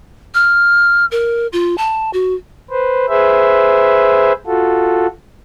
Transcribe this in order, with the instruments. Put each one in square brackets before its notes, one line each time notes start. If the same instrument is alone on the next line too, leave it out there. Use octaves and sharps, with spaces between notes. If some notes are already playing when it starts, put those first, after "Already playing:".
[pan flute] F6
A#4
F4
A5
F#4
[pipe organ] B4 C5
G#4 B4 C5 E5
F4 F#4 A4